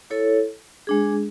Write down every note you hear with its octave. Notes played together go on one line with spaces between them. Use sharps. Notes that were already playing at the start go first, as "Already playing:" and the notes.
E4 A4 C#5
G#3 D4 G#4